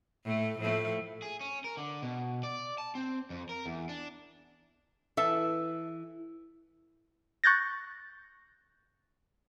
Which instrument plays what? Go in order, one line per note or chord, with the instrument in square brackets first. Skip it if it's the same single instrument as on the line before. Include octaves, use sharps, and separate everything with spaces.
[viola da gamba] A2 A3
A2 F3 A3
[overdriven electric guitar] G#4
C#4
A#4
D3
B2
D5
A5
C4
F2
A#4
E2
D4
[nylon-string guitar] E3 [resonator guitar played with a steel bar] A4 E5 A5
[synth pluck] C#6 F#6 G6 A6 A#6